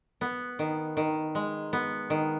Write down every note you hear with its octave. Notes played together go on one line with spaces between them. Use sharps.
B3
D#3
D#3
G#3
B3
D#3